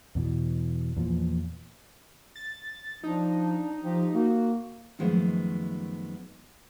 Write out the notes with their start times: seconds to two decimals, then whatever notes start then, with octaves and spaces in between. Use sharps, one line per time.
0.15 E2 B2 E3
0.97 E2 A#2 F3
2.36 A6
3.03 F3 D4 D#4
3.82 F3 G4
4.13 A#3 F#4
4.99 F#2 D#3 F3 G#3 A3 B3